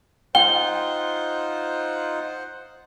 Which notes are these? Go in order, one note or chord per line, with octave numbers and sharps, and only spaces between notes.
D#4 F4 C5 F#5 G5 G7